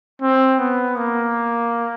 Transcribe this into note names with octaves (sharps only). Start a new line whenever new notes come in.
C4
B3
A#3